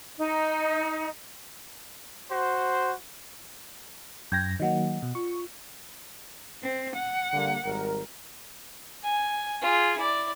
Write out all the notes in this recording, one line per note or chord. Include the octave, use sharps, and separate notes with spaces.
D#4
F#4 C5
F#2 G5 G6 G#6 A#6
D#3 F#3 A#3 D#5 F#5
B2
F4 C#6
C4
F#5
D3 G3 A#3
G#1 G3 A#4
G#5
F4 G#4
E4 D5